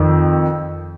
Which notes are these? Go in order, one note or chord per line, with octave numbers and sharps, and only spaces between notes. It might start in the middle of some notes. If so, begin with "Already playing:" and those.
Already playing: F2 D#3